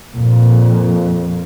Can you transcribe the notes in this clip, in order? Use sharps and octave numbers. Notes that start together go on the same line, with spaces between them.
F2 A#2